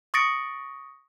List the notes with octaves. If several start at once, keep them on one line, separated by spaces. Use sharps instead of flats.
C#6 D#6 A6 A#6 C#7 D7